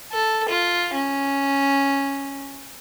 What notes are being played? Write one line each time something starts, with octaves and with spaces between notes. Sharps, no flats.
A4
F4
C#4